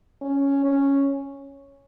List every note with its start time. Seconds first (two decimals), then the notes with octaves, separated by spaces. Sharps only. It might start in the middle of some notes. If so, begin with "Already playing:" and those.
0.22 C#4
0.64 C#4